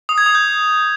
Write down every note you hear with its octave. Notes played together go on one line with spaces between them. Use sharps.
D#6
G#6
D#6
G6